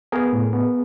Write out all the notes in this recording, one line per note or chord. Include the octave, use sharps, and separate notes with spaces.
B3 G#4 A#4
A2
B3